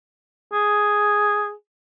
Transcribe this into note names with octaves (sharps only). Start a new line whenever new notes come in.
G#4